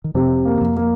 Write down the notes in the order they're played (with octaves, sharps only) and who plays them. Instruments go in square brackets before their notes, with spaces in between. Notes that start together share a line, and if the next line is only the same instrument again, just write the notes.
[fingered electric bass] D#3
[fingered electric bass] F2 F3 [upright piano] C3
[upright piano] A#3
[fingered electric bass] D#3
F2 F3
[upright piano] A#3